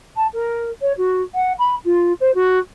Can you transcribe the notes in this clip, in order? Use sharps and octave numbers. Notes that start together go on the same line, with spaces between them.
A5
A#4
C#5
F#4
F#5
B5
F4
C5
F#4